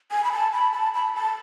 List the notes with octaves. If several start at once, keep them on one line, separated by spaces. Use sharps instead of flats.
G#5
B5
A5
B5
A5
B5
A5